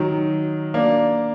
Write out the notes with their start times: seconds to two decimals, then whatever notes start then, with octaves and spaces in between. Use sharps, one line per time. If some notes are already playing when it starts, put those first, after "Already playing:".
Already playing: D#3 F#3
0.74 A#3 D4